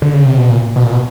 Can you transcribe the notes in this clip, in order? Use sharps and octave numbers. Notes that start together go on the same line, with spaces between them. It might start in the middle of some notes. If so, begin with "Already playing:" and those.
D3
C#3
C3
B2
A#2
B2
A#2
B2